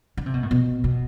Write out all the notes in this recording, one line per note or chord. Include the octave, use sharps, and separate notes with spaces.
D3
C3
B2
A2
B2
B2